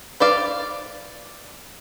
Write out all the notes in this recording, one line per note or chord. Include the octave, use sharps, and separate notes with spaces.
B4 C5 D5 F5